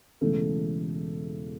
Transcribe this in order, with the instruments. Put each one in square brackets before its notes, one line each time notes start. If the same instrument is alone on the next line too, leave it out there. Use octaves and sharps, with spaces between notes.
[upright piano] E1 E2 C#3 E3 A3